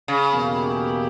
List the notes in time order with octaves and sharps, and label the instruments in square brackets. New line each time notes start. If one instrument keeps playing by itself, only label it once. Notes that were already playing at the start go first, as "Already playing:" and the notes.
[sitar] C#3
[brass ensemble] E2 B2 A#3 E4 G4